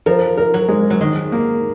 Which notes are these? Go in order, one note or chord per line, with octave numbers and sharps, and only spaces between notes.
F3 A#4
A#4
F#3
G#3
F#3
D#3 G#3
A#3